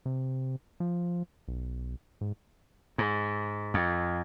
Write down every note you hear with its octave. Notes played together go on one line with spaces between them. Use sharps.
C3
F3
B1
G#2
G#2
F2